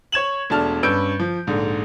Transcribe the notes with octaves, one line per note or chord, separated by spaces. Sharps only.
C#5 G#6 E7 F#7
E1 A3 D4 A5 F6
G2 C#4 B4 E6 G6 D7
F3
A#1 G#2 D3